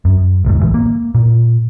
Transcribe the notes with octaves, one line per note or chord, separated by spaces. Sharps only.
F#2
E1 D2 G#2
A#1 A2 E3 G#3
A#3
A#2